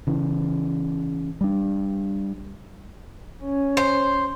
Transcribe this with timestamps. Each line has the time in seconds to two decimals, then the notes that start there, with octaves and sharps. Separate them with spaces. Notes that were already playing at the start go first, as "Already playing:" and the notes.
0.07 C#3 E3
1.41 G3 D4
3.44 C#4
3.77 C5